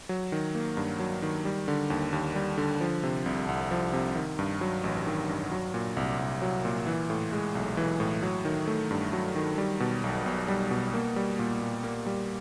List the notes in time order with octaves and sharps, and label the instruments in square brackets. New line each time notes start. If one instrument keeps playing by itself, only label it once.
[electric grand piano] F#3
D#3
A#3
G2
F#3
D#3
G3
D3
D#2
D#2
G3
D3
F3
C3
C2
C2
F3
C3
D#3
G2
F#3
A1
D#3
G2
F#3
A#2
C2
C2
F#3
A#2
E3
A2
G#3
B1
E3
A2
F#3
D#3
A3
G2
F#3
D#3
G3
B2
B1
B1
G3
B2
A#3
G3
A#2
A#2
A#3
G3